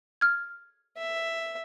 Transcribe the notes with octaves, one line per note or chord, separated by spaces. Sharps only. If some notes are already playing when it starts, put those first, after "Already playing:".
F6 G#6
E5